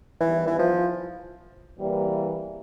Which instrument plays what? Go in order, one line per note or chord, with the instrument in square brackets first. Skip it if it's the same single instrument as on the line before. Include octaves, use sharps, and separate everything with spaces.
[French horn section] G#2 D#3 G3 B3 E4 [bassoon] E3
[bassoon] E3
F3
[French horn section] E2 C3 E3 G3 A#3